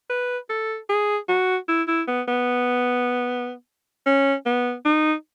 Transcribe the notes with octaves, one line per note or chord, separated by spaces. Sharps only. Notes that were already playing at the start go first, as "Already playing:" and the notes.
B4
A4
G#4
F#4
E4
E4
B3
B3
C#4
B3
D#4